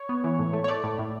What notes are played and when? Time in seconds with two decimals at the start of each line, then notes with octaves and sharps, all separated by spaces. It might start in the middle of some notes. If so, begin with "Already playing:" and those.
Already playing: C#5
0.09 B3
0.24 E3
0.39 A2
0.53 A3
0.64 C#5
0.68 A3 D5
0.84 A2
0.99 A2